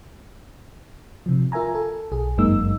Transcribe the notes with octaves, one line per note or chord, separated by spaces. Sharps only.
C3 F3
F4 A#4 E5 G#5 A#5
A4
B1 G#4
G1 F#2 G#3 A#3 D#4 E6